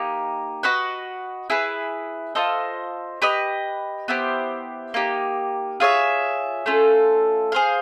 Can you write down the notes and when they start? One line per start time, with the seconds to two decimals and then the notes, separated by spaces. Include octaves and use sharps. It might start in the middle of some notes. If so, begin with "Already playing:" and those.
Already playing: A#3 D#4 G4
0.63 F#4 B4 D#5 F#5
1.50 E4 G#4 B4
2.35 F4 A4 C5 D#5
3.22 G4 B4 D#5
4.08 B3 E4 G4 C5
4.94 A#3 D#4 G4
5.80 F4 G#4 C#5 E5
6.66 A3 C#4 F4 A4
7.52 G#4 C5 F5